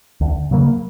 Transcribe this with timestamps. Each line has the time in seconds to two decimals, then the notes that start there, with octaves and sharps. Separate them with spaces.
0.21 D2
0.51 C#3 F#3 A#3